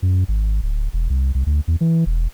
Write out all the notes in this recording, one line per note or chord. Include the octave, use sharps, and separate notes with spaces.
F#2
G#1
D1
E1
C2
C2
D2
E2
E3
E1